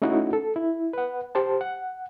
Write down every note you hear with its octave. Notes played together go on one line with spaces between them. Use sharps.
A3 C#4 D#4 E4 F#4
A4
E4
B4 F#5
G4 C5 A5
F#5